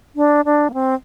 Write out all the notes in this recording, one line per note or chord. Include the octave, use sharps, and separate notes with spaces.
D4
D4
A#3
C4